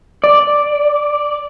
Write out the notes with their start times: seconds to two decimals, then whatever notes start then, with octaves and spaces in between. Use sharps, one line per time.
0.24 D5